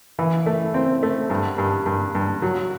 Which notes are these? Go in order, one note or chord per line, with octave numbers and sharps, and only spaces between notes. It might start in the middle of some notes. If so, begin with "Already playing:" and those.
E3
A3
C4
A3
G2
G2
G2
G2
F#3